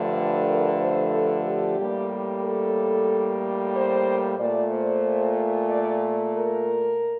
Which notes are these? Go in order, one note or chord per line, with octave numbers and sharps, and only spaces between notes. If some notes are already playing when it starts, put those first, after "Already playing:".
Already playing: G2 D3 F3 A3
A#4
C5
A4
G4
A2 G3 A#3
A4
C5
A#2 A3 D5
C5
D5
A#4